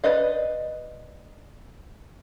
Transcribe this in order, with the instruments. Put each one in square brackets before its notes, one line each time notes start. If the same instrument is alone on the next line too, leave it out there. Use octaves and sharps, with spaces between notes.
[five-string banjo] B4 D5 D#5 F5